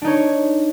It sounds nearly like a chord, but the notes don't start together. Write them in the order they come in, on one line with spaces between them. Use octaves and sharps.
D4 D#4 C#5